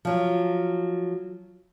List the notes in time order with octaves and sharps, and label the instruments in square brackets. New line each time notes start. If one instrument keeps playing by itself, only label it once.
[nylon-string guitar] F3 F#3